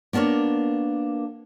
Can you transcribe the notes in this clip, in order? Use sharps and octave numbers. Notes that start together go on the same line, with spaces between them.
A#3 B3 D4 A#4 C#5